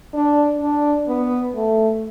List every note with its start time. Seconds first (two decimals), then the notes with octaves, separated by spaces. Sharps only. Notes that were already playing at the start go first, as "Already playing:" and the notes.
0.13 D4
0.61 D4
1.08 B3
1.55 A3